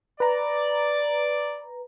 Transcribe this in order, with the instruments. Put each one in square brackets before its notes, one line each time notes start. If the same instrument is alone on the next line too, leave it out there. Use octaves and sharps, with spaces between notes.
[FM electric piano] B4 A#5 [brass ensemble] D5